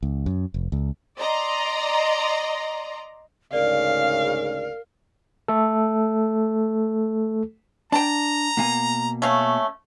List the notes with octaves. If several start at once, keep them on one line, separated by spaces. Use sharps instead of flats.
C#2
F#2
F1
C#2
D5 D#5 A#5 C6
D2 G#2 C#3 A#4 D5 F5
A3 A4
D4 G5 A5 A#5
B2 A#3 G#5
A3 C#4 F5